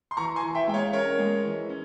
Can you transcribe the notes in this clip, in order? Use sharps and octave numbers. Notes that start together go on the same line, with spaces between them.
C6
E3 A#5 C#6
G#5 C6
E3
E5 G5
G#3 G5
C#5 F5
C#4 A#4 C#5
G#3
E3
C#4